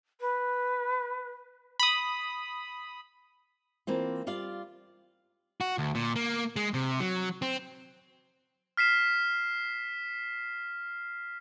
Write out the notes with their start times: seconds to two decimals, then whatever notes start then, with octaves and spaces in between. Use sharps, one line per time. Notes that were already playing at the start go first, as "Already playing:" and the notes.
0.20 B4
1.79 B5 D#6
3.87 E3 A#3 C4 F4
4.27 G3 F4 D5 F5
5.61 F#4
5.78 D2
5.95 A#2
6.16 A#3
6.56 G#3
6.74 C3
7.00 F#3
7.42 C4
8.77 F6 B6 C7 E7